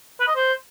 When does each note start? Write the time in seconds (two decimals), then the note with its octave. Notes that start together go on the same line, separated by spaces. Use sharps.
0.20 B4
0.28 D#5
0.36 C5